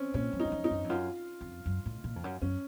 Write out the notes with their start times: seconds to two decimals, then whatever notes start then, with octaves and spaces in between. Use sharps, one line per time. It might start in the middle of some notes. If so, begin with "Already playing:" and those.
Already playing: C4 C#4
0.14 A#2 C#4
0.33 F#2
0.40 D#4
0.45 F#2
0.52 F2
0.64 D#4
0.71 F#2
0.84 F2
0.90 F#2 F4
1.41 F2
1.66 F#2
1.86 A2
2.04 A#2
2.16 F2
2.24 F#2
2.42 F#2 C#4